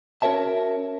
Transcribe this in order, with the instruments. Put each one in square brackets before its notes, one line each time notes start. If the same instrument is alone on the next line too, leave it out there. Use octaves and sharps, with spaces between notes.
[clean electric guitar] C#4 F#4 A#4 C#5 E5 A5